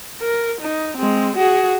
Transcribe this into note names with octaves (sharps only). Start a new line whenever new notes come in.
A#4
D#4
G#3 C4
F#4 G#4